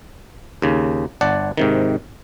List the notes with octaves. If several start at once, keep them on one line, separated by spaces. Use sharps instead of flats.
D#2 C#3
G1 D5 F#5 A5
G#2 C3 D#3